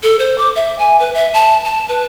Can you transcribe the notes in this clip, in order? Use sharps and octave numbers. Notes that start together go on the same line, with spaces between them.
A4
C5
D6
E5
G#5
B4
E5
A5
A5
B4